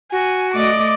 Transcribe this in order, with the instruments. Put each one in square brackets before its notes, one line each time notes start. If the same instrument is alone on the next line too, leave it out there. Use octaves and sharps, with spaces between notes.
[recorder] F#4 [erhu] G#5
[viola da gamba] A3 D5 D#5 [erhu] D6